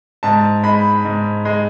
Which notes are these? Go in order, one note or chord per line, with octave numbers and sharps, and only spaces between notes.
G#2 A5
G#3 B5
G#2
G#3